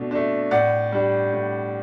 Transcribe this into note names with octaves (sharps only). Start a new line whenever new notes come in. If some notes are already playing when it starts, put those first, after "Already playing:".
Already playing: B2 A3 D4
A3 D4
A2 D5 F#5
G3 D4
A2